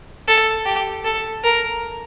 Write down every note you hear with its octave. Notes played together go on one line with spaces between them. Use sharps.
A4
G4
A4
A#4